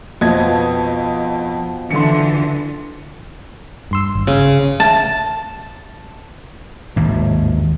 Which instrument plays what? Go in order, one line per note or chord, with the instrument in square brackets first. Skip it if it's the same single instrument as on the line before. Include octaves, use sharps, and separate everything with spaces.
[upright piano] F2 D#5 G#6 [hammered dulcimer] B2 F3
[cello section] D3 E3 [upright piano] C6 C#7
[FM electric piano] G2 C6 E6
G#1
[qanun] C#3
[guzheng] A5
[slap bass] G#1 D#2 A2